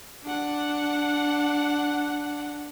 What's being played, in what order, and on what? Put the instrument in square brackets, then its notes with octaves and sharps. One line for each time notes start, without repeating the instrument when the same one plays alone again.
[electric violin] D4 F#5